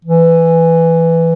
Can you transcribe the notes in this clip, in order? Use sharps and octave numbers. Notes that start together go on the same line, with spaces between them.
E3